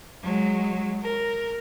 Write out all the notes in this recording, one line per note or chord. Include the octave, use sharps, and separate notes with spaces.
F#3 G#3
A#4